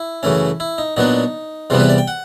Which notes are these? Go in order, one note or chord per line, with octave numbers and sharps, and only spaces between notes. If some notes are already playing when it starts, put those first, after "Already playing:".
Already playing: E4
F#2 C#3 E3 A3 C#4
E4
D#4
A#2 F#3 B3 D4 D#4
E2 C3 E3 G3 B3 F4
B4
D5
G5
F#5